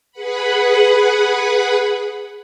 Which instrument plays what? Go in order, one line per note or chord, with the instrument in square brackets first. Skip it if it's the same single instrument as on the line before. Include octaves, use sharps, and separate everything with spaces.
[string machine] G#4 B4 F#5 B5